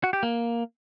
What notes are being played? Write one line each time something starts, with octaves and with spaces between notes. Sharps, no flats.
F#4
G4
A#3